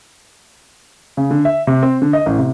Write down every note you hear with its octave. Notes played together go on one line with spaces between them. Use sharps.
C#3
D3
E5
C3
C4
D3
D#5
A1
C3